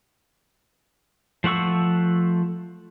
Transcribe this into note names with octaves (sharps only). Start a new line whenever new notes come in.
F3 A3 F#5 C#6 E6